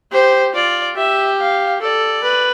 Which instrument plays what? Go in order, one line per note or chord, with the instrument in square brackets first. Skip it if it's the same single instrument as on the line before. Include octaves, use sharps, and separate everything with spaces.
[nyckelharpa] G4 [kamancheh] C5
[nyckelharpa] F4 [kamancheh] D5
[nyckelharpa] G4 [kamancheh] E5
[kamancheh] F5
[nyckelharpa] A4 [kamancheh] D5
[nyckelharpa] B4